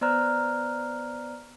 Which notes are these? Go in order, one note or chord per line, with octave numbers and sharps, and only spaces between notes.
B3 C5 D5 A#5 F6 F#6